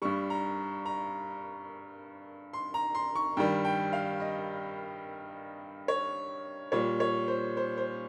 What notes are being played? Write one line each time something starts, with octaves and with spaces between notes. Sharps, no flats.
G2 G3 C#6
A#5
A#5
C6
A#5
C6
C#6
G2 D#3 G3 G5
G5
F5
D#5
C#5
A#2 G3 C#5
C#5
C5
C5
C5